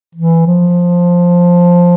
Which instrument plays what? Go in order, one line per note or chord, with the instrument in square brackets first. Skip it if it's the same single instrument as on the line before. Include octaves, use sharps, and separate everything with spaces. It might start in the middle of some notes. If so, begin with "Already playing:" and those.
[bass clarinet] E3
F3